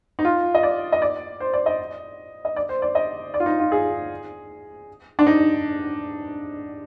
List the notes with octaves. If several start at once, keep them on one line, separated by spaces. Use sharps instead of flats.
D#4
F4
D#5
D5
D#5
D5
C5
D5
D#5
D#5
D5
C5
D5
D#5
D5
F4
D#4
F4
G#4
D4
D#4